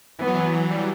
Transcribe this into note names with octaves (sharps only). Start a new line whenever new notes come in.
E3 B3
F#3
E3
E3
F#3
G3
F#3